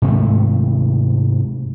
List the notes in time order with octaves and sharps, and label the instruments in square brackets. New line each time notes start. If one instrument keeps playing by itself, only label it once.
[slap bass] G#2 C3 A3